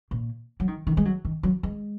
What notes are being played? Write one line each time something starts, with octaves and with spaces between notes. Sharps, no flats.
A#2
F#3
D#3
D#3
G#3
F#3
D#3
F#3
G#3